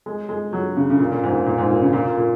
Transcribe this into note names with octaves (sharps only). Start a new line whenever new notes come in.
G#3
G#3
F#3
C#3
C#3
A#2
A#2
G#2
A#2
G#2
A#2
G#2
A#2
C#3
A#2
A#2
A#2